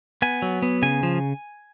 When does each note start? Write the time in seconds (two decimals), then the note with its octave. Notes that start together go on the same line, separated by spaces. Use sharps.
0.22 B3 G#5
0.42 F#3
0.62 B3
0.82 C#3 G#5
1.03 F3